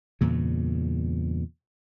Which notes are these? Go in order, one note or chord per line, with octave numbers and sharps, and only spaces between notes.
E2 G2 A#2 C#3